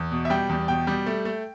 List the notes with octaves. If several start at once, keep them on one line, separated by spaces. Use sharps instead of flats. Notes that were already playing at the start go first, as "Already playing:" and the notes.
Already playing: E2
B2
E5
G3 G5
E2
B2 G5
G3
A3
A3